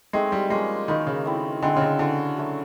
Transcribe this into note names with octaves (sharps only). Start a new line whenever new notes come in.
G#3 A3 C4 D#4
G3
F3 G#3 A#3 C#4
D#3 A#3 D#4 F#4 B4
C#3
A3 C4 E4
D3 G#3 C4 E4
C#3
D3
D3 C#4 F#4 A4
F#3 A3 C#4 F#4